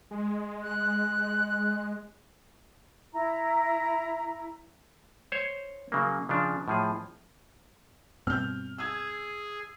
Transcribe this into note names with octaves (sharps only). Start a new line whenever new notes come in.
G#3
F#6
E4 A#5
C5 C#5
C#3 F#3 A#3
C#3 F3 D4
A2 F3 G#4
G2 B2 C4 F6 G6
G#4 E6 G#6